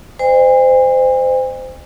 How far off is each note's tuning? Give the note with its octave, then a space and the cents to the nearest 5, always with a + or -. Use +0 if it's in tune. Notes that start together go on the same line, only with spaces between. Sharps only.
C5 -20 D#5 -45 G#5 -45